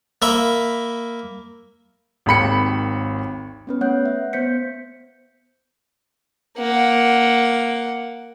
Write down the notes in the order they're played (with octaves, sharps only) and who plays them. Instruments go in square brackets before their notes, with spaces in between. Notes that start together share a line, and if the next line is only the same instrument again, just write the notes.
[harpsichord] A#3 E5 B5
[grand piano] G#1 D#2 B5 C#7
[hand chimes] B3 C#4 B4
A3 C#5 F#5 F#6 G6
E5
B3 C5 G6 B6 C#7
[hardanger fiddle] A#3 F#5